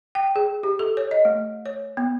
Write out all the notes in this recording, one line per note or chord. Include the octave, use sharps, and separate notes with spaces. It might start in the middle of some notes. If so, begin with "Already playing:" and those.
G5
G#4
G4
A4
C#5
D#5
A3
C#5
B3